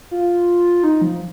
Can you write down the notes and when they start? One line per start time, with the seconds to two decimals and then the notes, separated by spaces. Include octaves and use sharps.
0.11 F4
0.83 D#4
1.02 F3